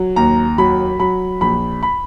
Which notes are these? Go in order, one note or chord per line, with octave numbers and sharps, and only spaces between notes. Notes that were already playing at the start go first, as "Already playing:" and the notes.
Already playing: F#3
D#2 A#5
F#3 B5
F#3 B5
A#1 B5
B5